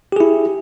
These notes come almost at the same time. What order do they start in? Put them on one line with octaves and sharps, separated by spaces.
G4 G#4 E4